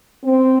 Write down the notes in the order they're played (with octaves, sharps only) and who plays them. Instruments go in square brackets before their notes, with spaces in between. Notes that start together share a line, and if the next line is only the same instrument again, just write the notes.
[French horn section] C4